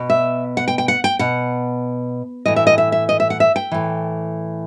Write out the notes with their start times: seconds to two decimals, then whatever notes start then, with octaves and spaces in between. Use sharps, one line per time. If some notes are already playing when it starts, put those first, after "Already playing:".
Already playing: B2
0.10 E5
0.57 F#5
0.68 G5
0.78 G5
0.88 F#5
1.04 G5
1.19 B2 F#5
2.46 A2 E3 D#5
2.56 E5
2.67 D#5
2.78 E5
2.92 E5
3.09 D#5
3.20 E5
3.30 F#5
3.40 E5
3.56 G5
3.72 A2 E3